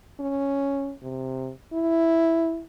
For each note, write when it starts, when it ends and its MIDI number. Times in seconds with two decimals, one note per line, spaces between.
0.20 0.93 61
1.02 1.51 48
1.73 2.62 64